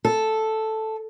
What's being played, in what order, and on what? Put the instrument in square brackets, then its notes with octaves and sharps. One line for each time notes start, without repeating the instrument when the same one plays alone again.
[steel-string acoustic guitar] A4